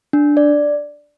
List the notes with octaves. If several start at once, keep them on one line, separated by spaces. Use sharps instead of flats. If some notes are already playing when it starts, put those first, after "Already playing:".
D4
D5